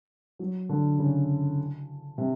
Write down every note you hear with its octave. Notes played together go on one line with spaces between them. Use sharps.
F#3
D3
C#3
C3